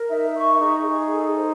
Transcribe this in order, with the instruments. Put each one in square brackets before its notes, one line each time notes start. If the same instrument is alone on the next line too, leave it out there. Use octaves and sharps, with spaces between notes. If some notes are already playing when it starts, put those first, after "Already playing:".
Already playing: [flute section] A#4
[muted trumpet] D#4 [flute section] E5
[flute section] C#6
[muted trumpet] D#4 [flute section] G#4
[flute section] G#4
A4
C5